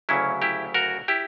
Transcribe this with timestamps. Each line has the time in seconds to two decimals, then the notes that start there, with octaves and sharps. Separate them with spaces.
0.09 D2 C#3 F#3 C#4 E4
0.42 E4 G4
0.74 F#4 A#4
1.08 E4 G4